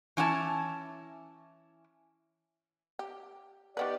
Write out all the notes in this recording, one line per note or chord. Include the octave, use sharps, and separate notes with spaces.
E3 C#4 E4 F5 A5
G4
D#3 B3 G4 B4 D5